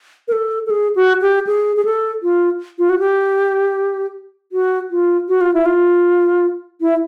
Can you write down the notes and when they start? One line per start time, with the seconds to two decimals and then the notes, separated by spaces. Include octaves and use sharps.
0.28 A#4
0.32 A4
0.66 A4
0.70 G#4
0.96 F#4
1.22 G4
1.47 G#4
1.77 G#4
1.85 A4
2.23 F4
2.79 F4
2.89 F#4
2.99 G4
4.52 F#4
4.91 F4
5.29 F#4
5.41 F4
5.54 E4
5.66 F4
6.81 E4